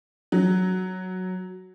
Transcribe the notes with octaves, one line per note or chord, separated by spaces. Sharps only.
F#3